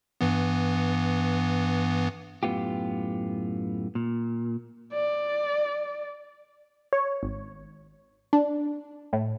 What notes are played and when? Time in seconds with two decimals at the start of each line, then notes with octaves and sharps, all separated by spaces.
0.21 G2 E3 B3
2.43 F#2 A2 B3 F4 G4
3.95 A#2
4.93 D5
6.93 C#5
7.23 G#1
8.33 D4
9.13 A2